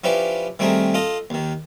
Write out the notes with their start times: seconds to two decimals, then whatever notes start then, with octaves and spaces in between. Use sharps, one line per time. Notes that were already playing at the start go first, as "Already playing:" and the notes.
0.04 F3 C#4 E4 G4 B4 D5
0.59 D#3 G3 A3 C4 G#4 A#4
0.94 F4 A4 D#5
1.30 D#2 D#3